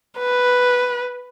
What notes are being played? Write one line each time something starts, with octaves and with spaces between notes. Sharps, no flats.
B4